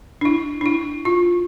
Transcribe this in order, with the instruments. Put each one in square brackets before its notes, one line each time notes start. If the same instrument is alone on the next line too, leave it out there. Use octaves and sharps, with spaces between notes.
[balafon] D4
E4
D4
E4
F4